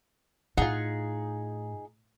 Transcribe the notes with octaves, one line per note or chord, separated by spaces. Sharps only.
A2 D#4 F4 G#4 F#5